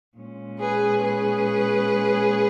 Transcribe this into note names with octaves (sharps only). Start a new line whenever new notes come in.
A#2 G#3 C#4
G#4 B4
G#4 B4